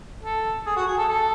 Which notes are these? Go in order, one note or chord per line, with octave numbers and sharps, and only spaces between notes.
A4
G#4
F#4
G#4
A4
A4